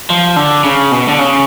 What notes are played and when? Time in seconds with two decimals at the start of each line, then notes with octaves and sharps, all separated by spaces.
0.10 F3
0.36 D3
0.64 C#3
0.92 B2
1.08 D3
1.19 C#3